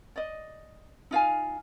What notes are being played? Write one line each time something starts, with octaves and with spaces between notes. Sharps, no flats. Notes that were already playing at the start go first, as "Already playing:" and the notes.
D5 D#5
D#4 F4 F5 G#5